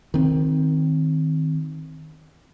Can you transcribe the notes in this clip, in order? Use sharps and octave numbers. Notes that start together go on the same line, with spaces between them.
D#3 C4